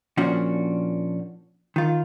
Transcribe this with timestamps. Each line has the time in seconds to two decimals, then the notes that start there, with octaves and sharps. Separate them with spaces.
0.17 A#2 F3 C#4 D4 F#4
1.76 D#3 F4